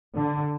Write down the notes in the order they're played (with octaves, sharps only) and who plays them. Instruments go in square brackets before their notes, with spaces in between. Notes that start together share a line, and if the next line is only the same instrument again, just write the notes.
[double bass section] D3